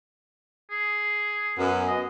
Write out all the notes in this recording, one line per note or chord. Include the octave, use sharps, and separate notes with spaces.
G#4
F#2 B3
D#5